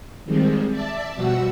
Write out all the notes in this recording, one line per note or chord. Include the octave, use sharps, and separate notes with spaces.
D#3 F3 G3 G#3 C4
D5 E5 A5
B2 F3 G3 F#4 F#5 E6